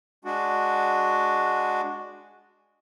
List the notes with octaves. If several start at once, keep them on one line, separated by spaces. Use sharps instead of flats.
G#3 D4 F#4